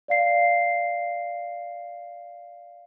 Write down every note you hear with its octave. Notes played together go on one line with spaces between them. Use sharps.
D5 F5 C7